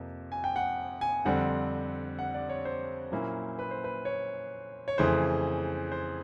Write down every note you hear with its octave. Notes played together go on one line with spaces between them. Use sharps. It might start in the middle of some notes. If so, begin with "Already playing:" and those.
Already playing: F2 C3 F3 A#3
G#5
G5
F#5
G#5
F2 D3 G3 C4 F#5
F#5
D5
C#5
C5
A#2 F#3 A#3 C#4 E4
B4
C5
B4
C#5
C#5
F2 C#3 E3 A3 C5
C5